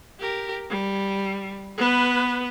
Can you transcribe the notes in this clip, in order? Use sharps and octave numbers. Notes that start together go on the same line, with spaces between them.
G4 A#4
G3
B3 B4